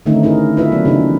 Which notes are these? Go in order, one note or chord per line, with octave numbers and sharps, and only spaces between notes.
D3 D#3 A3 C4 C#4 D#4
D#4 E4 G#4 A#4
E4 F4 A4 B4 C#5 E5
F#3 B3 C4 D5
C#3 D4 D#4 G#4
E3